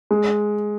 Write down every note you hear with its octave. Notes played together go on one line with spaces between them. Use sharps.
G#3